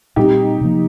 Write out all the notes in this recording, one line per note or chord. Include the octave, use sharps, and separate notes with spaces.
A#2 G3 C4 D#4 G4
C3 F3 A#3